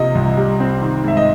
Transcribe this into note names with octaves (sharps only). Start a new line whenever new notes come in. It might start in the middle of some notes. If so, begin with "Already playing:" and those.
Already playing: C3 F3 A#3 D#5
C2
G3
C4
D#3
G#2 E5
D#5